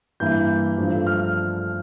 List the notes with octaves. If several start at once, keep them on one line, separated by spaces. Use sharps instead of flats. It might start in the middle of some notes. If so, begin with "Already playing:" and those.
G2 E3 A#3 E4 G6
G2 F3 A3 D4
F6